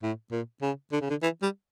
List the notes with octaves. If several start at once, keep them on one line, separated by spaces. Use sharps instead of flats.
A2
A#2
C#3
D3
C#3
D3
E3
G3